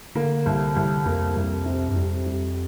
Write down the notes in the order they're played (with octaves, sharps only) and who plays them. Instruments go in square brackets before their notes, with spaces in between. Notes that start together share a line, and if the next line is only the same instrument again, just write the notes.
[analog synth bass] D3 [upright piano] A#3
[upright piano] C2
C2
[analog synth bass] F2 [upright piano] A#3
[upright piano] C2
C3
[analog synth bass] G2
[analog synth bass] F2 [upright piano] G3
[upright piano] G3